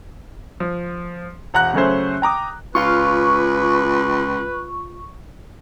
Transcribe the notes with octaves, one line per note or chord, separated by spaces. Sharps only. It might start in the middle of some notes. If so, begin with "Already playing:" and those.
F3
E1 F#5 A#5 F#6
C#3 F#3 A3 C#4 C5
G5 A#5 D6 D#6
C#2 F4 B4 F5 C#6